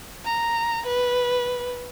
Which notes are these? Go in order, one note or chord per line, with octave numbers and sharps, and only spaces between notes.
A#5
B4